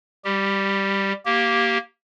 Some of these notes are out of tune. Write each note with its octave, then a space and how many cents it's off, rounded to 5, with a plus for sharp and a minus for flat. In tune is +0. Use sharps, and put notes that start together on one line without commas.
G3 +10 G4 -10
A#3 +0 G4 -10